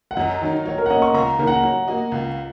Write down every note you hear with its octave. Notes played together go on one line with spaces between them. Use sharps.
F#5
F#2 D#5
D#3 F#3 D#4
F#3 C#5
A#4
F#5
A#3 C#4 D#5
C#6
C#2 A#5
C#3 A#3 D#4 A#4
F#5
F#3
A#3 F#4 D#5
C#2